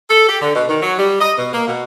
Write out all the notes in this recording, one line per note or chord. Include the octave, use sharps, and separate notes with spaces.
A4
G4
D3
B2
D#3
F#3
G3
D#5
B2
A#3
B2